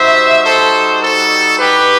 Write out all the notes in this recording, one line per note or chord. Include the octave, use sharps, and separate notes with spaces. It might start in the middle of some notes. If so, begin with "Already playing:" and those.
Already playing: G3 D#4 F#4 C5 E5
A4 C5
A4
G4 B4